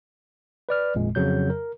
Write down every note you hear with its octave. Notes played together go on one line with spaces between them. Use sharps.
B4 D5 F6
G#1 F2 A#2 G#3
F2 C#3 F#3 G6
A#4